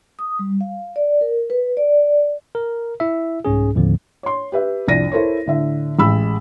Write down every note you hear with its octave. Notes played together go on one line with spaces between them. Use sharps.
D#6
G3
F5
D5
A#4
B4
D5
A#4
E4 E5
C2 G#2 C#4 G#4
D#2 A2 D3 F3 C4
C#5 C6
G4 B4 E5
C2 F2 D4 A#6 D#7
E4 A4 A#4 C5 C#5
A2 D3 E5
A1 G#3 B5 E6